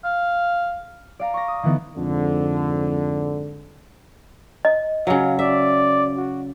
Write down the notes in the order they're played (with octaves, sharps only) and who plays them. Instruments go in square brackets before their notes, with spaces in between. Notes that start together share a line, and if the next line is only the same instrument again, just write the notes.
[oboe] F5
[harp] D5 F5 A#5
C#6 D6 A#6
D#6
D3 E3 A3 B3 D#4
[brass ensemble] F2 G#2 D3
[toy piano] D#5
[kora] C#3 F#3 [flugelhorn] F5
[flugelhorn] D5 [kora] E5
[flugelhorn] F#4